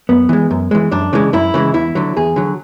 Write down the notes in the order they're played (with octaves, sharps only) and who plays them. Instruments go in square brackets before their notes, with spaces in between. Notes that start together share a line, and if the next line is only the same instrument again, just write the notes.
[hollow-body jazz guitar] F#2 B3
E3 G#3
F#2
E3 G#3
F#2 D4
C#3 E3 G#3
F#2 E4
C#3 E3 G#3
E2 E4
D3 F#3
E2 G#4
D3 F#3